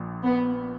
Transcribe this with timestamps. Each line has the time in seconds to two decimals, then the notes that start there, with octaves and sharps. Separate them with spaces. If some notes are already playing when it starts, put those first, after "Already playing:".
Already playing: A#1 A#2
0.24 B3